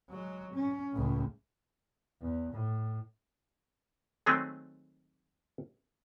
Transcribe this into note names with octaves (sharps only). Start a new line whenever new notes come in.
F#3 G#3
C#4
C#2 A2
E2
A2
D#3 F#3 G#3 A3 C4